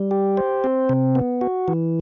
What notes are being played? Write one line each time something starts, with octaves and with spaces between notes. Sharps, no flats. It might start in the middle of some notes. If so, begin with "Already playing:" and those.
Already playing: G3
G4
C5
C4
C3
B3
F#4
E3